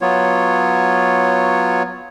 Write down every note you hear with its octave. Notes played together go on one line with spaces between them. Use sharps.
F#3 B3 F4 C#5